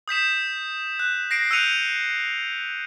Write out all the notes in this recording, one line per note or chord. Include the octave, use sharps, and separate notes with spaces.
D#6 G6 B6 E7
F#6
A#6 C7 D7
E6 F#6 G6 C#7 D#7 F7